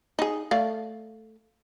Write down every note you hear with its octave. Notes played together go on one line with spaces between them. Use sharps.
D#4 G#4
A3 D5 F5